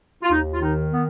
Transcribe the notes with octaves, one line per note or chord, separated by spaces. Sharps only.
F4
D#2 D#4
F4
D#3 D#4
B3